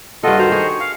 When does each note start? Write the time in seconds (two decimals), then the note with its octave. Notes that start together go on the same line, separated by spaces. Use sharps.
0.23 G2 F4 A4 D#5 F#5
0.39 D#3 F#4 C5 A#5
0.52 G#4 C#6
0.80 F5